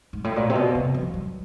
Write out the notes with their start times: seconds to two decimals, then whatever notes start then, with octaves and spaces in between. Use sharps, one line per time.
0.13 G#2
0.24 A2
0.36 A#2
0.50 C3
0.55 B2
0.75 C3
0.94 F3
1.14 F#3